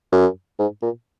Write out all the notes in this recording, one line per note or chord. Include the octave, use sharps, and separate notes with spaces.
F#2
G#2
A#2